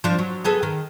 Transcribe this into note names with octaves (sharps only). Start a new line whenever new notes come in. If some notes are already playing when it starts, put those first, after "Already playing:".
F3 D4
F#3
B3 G#4 A4
D#3